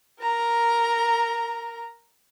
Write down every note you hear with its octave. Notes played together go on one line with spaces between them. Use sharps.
A#4 A#5